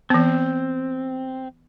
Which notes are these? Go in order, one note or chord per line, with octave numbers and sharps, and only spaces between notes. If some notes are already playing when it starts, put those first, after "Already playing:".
E3 B3 C4